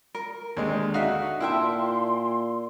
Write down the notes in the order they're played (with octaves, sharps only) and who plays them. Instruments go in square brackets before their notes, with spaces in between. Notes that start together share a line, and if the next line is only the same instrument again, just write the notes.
[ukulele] A#4
[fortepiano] D#2 G#3 [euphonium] D3 [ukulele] G#4
[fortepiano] D#4 F#4 [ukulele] A4 E5 F5
[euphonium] A#2 [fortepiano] E4 E5 [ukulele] A#4 G5 A5 [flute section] C6